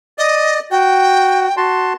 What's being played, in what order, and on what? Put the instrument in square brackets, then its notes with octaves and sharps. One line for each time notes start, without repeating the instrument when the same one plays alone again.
[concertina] D5 [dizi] D#5
[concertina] F#4 [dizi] G5
[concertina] F#4 A5 C6